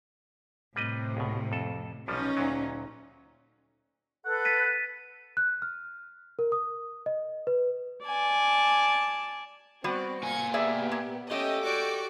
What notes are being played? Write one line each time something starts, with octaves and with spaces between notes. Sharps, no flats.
A2 C3 G3 B4 D#5
C#2 B2
F2 A4
B1 F3 G3 C#4 D#4
D2 A#2 F#3
A4 B4 F#5
A6 B6 D#7
F#6
F6
A#4
D#6
D#5
B4
D5 G#5 A5
G3 B3 C4 F#4 D5
A#3 G#5 G#6 C#7
B3 G4 G#4 D5 E5
A#2
A3 C#4 G4 D#5
F#4 D5 C#6 D6